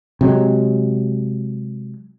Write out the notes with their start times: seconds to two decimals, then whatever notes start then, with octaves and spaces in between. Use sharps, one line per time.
0.21 C3 F#3 G#3